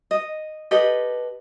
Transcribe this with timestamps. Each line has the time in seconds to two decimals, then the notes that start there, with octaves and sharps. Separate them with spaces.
0.11 D#5
0.71 G4 A4 B4 D#5